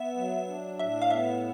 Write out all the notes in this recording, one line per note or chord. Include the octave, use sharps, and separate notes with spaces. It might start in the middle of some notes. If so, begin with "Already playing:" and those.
Already playing: B3 E5
F#3
D4
A2 E5
F5
B3 E5